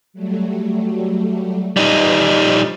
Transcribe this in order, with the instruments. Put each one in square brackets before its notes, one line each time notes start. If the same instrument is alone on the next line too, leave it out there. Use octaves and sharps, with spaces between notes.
[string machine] F#3 G3 A3
[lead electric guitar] G3 D#4 [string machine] B4 D#5 E5
[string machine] F3